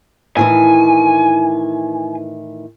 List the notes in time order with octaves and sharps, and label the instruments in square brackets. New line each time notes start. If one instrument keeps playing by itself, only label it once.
[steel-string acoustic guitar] A2 D#3 E3 [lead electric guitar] G#5